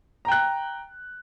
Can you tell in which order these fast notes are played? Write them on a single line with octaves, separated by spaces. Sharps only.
A#5 G5 F#6